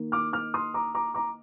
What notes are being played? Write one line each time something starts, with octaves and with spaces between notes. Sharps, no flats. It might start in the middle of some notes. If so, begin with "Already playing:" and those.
Already playing: D#3 A#3
D6 F6
D6 F6
C6 D#6
A#5 D6
A#5 D6
A#5 D6